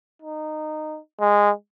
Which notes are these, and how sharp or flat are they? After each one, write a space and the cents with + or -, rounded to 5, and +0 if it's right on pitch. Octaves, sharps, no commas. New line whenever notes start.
D#4 -15
G#3 -15